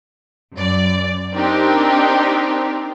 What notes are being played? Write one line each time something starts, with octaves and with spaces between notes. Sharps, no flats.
F#2 D5
C4 D4 D#4 G4 A#4